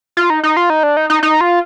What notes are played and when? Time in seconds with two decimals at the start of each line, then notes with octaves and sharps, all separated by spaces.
0.17 F4
0.30 D#4
0.43 D#4
0.57 F4
0.70 D#4
0.83 D4
0.97 D#4
1.10 D#4
1.23 D#4
1.41 F4